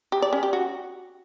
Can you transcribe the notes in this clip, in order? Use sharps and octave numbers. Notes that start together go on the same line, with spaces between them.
G4
D5
C#4
G4
F#4